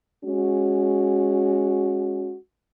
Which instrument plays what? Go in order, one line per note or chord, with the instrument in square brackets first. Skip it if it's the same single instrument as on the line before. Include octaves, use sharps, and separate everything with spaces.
[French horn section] G#3 C#4 F#4